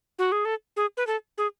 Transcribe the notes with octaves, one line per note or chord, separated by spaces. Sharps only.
F#4
G#4
A4
G#4
B4
A4
G#4